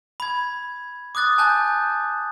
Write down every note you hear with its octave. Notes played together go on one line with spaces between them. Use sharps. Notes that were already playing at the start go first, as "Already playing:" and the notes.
B5 G#6
D6 D#6 F#6 A6
G#5 A5 F#6 G6